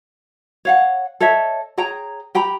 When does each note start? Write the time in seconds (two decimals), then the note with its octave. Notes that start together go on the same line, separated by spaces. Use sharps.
0.65 C#5 F5 F#5
1.20 A4 C#5 D#5 E5
1.78 G#4 C#5 G5 A#5
2.35 G4 G5 A#5 B5